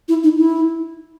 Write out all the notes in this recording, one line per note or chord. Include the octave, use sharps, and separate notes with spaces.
E4
D#4
E4